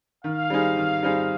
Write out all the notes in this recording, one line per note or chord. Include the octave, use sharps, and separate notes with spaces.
D#3 F5
G3 C4 D#4 G#4
D#3
G3 C4 D#4 G#4